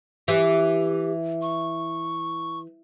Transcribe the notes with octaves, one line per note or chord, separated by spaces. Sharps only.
E3 G4
C#6